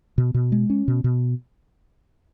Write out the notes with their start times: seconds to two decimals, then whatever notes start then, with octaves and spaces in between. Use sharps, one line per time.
0.18 B2
0.34 B2
0.52 G#3
0.70 C#4
0.88 B2
1.04 B2